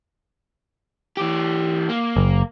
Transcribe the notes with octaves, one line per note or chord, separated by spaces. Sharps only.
E3 G4
A#3
F#1